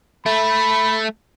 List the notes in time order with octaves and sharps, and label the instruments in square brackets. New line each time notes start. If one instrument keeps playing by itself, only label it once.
[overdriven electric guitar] A3 [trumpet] B5